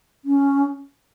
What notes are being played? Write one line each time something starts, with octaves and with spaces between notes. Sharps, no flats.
C#4